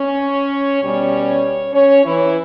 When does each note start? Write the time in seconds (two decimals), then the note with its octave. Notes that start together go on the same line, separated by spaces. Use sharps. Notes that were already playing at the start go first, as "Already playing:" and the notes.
Already playing: C#4 C#5
0.81 B2 G3 C#4
1.73 C#4 C#5
2.05 E3 E4